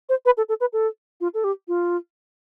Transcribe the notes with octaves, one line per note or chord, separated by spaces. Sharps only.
C5
B4
A4
A4
B4
A4
F4
A4
G4
F4